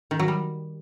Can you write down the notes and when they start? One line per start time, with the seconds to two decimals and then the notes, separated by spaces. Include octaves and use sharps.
0.11 D#3
0.20 F#3
0.28 G3